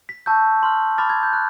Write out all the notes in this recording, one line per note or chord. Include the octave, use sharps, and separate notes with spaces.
B6
A5 C#6 E6 G6
C6 F6
B5 D6 F6 A6
G#6
G6
F#6